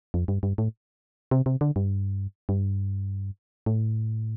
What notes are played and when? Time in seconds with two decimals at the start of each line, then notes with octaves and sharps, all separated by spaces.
0.14 F2
0.28 G2
0.43 G2
0.58 A2
1.31 C3
1.46 C3
1.61 D3
1.76 G2
2.49 G2
3.66 A2